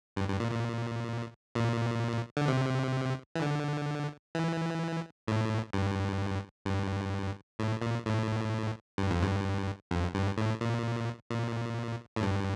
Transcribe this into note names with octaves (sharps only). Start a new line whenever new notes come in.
G2
G2
A#2
A#2
A#2
D3
C3
E3
D3
E3
A2
G2
G2
A2
A#2
A2
G2
F2
G2
F2
G2
A2
A#2
A#2
A2
G2